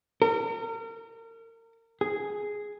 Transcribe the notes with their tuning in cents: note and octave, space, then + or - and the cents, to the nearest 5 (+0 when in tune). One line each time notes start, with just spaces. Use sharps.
A#4 -35
G#4 +0